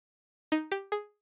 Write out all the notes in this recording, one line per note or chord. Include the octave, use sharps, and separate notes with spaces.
D#4
G4
G#4